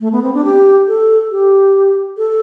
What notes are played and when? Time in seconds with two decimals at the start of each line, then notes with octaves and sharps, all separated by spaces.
0.01 A3
0.12 B3
0.22 C4
0.34 D4
0.45 G4
0.88 A4
1.31 G4
2.18 A4